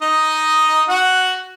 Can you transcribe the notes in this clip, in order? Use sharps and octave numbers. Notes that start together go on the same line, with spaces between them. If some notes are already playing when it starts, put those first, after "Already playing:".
D#4 D#5
F#4 F#5